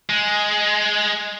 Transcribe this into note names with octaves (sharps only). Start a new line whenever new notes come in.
G#3